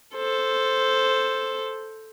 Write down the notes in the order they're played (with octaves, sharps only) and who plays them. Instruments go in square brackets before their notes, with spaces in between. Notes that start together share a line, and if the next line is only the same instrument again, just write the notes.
[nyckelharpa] A4 C5